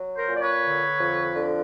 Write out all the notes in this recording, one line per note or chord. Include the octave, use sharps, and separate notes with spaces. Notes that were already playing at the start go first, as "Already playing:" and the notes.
Already playing: F#3
A#4 C5
A#2
D5
B4 C#5
D3
F2
D3